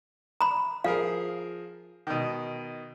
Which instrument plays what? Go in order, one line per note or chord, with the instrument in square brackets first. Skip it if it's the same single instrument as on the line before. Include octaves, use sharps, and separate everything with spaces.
[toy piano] A#5 B5
[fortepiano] F3 G#4 A#4 [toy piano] F5
[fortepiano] B2 D#3